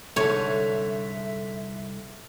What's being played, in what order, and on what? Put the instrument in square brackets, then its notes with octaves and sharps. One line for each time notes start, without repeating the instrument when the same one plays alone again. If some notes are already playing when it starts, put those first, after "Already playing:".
[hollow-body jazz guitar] C2 D4 A4 [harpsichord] G#2 D3 [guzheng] C#5 [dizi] E5